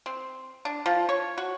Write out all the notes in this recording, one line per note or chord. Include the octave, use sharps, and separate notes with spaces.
C4
D4
F3
C#5
F#4